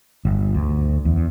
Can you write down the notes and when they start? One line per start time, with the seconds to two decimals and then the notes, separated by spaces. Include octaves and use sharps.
0.25 G1
0.54 D2
1.05 E2